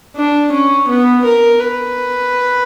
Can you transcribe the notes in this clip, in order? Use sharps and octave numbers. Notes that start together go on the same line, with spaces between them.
D4
C#4
B3
A#4
B4